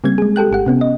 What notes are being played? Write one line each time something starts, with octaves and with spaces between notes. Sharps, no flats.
C#3 G3 A#3 C4 G#6
G#3 G#4
G4 A4 G5 F#6
G1 G4 F#5
C3 B3 C#4
D#5